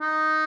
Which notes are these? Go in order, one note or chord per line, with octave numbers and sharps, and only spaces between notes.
D#4